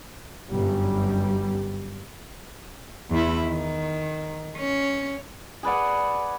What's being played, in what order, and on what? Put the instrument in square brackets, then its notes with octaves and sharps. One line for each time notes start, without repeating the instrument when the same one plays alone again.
[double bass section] G1 F#2 G3
[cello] E2 E4
D#3
C#4
[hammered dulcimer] G#4 B4 D5 F#5